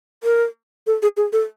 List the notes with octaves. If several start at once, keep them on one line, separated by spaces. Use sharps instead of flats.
A#4
A4
G#4
G#4
A4